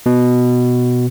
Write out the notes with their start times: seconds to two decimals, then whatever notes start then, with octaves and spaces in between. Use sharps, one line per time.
0.06 B2